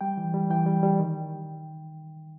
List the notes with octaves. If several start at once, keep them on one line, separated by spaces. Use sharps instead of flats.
G3 G5
E3
G3
E3 G5
G3
G3
D#3